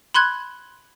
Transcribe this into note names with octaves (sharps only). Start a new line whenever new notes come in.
B5 C6 F#6 G#6